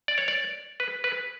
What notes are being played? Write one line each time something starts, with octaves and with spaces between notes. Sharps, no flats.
D5
C#5
D5
B4
B4